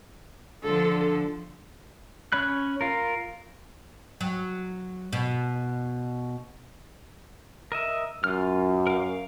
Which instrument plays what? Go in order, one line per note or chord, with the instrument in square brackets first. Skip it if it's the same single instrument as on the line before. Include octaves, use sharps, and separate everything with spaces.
[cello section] D3 F3 [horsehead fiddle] A4
[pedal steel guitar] C#4 C#5 B5 F#6
F4 A#4
[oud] F#3
B2
[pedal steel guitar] A#4 D#5 E5
[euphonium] F#2 [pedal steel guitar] F4 F6
[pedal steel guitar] A#4 F5